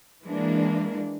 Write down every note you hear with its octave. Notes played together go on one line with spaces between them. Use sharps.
E3 G#3 A#3 D4